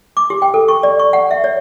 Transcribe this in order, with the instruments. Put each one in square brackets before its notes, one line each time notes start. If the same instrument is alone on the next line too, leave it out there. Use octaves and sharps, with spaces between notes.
[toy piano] D6
G4
G5
A4
C#6
D5
C#6
F#5
E5
C#5